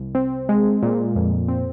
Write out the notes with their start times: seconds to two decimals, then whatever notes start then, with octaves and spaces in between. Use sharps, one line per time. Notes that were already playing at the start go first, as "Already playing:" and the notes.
Already playing: C2
0.15 C4
0.49 G#3
0.83 A#2
1.16 F2
1.48 C4